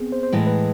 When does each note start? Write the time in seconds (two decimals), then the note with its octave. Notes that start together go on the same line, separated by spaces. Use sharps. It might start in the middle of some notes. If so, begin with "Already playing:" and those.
Already playing: B3 C4 G#4
0.12 C5
0.23 C5
0.33 A2 E3 G#3 E4
0.47 B4